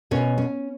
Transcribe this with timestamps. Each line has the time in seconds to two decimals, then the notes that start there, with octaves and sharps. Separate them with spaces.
0.11 B2 C#4 C#5
0.38 C#4